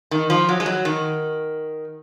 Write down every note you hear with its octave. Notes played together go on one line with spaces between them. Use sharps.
D#3
F3
F#3
G#3
F#3
D#3